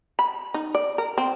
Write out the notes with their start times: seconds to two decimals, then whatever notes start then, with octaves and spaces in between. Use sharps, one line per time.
0.19 B5
0.54 D#4
0.75 D5
0.98 A#4
1.18 C4